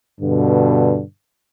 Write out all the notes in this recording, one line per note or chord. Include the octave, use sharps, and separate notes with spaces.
G2 B2 D3